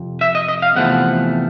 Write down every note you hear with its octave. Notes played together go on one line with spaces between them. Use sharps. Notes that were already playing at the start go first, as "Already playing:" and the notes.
Already playing: F2 C3
E5
D#5
D#5
F5
E2 C3 F3 A3 F#5